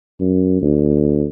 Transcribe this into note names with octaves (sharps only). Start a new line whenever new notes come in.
F#2
D2